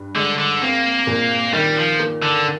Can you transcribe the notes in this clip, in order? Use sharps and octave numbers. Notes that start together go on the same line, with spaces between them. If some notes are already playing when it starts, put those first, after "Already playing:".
Already playing: G2
D3 G#3
D3
A#3 C4
A#2
D#3 G3
F3
A#3
D3